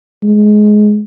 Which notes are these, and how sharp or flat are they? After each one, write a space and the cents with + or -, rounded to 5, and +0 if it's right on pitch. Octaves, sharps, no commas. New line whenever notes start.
G#3 +15